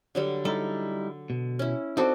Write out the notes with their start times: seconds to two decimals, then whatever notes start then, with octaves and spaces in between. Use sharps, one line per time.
0.15 D3 F#3 G3
0.45 G3 D#4 E4 A4
1.30 B2
1.59 C#4 E4
1.97 C4 D#4 F#4 A4 D5